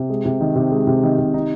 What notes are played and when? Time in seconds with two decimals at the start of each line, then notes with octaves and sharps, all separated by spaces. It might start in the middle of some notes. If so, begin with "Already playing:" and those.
Already playing: C3
0.10 G#3
0.25 C3
0.41 D#3
0.56 C3
0.71 G#3
0.87 C3
1.03 D#3
1.19 C3
1.34 D#4